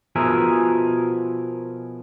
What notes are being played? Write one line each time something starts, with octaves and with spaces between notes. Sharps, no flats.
B2 F3 G#4 A#4 E5